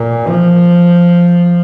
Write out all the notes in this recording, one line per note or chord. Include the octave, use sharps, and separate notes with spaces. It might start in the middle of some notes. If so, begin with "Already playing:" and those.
Already playing: A#2
F3